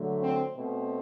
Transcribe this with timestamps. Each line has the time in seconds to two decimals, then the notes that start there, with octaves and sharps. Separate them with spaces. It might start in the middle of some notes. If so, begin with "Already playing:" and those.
Already playing: D3 F#3 A3
0.22 C4
0.55 B2 A3 C4